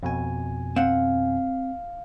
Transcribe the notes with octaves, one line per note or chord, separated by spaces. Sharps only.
F2 B2 G#5
C4 F5 F#5